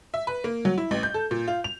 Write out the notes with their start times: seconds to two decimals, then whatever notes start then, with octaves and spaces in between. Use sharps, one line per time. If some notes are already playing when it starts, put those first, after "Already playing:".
0.14 E5
0.27 B4
0.44 A#3
0.65 F#3
0.78 E4
0.91 A1
1.03 G6
1.14 A4
1.31 A#2
1.48 F4
1.64 F7